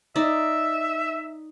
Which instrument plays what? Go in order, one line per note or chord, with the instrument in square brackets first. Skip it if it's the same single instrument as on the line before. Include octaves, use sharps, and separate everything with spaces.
[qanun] D#4 D5 [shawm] E5